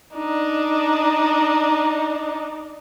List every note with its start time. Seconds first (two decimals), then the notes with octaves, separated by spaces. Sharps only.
0.15 D4 D#4